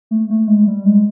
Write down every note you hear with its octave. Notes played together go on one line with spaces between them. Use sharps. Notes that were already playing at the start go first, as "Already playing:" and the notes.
A3
A3
G#3
G3
G#3